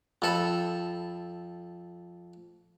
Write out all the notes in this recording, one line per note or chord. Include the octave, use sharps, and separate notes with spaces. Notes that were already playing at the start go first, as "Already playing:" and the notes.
F2 A4 B5